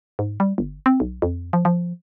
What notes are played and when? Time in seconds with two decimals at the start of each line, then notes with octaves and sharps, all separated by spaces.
0.19 G#2
0.40 G3
0.58 G1
0.86 C4
1.00 B1
1.22 F2
1.53 F3
1.65 F3